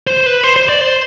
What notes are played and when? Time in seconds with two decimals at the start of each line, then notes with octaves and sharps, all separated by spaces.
0.07 C5
0.26 B4
0.44 C5
0.56 C5
0.69 D5
0.81 C5